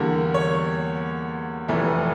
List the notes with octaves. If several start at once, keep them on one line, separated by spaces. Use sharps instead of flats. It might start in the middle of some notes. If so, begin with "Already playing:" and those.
Already playing: E2 D3 G3 A#3
C#5
F1 F2 E3 A3